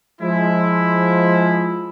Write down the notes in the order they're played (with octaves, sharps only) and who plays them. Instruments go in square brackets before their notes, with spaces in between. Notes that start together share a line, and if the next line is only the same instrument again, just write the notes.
[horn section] F3 G#3 E4